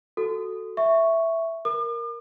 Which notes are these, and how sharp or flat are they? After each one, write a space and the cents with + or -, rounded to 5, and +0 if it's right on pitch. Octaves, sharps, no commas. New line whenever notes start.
F#4 +0 A4 +0
E5 +0 C#6 +0
A#4 +0 D6 +45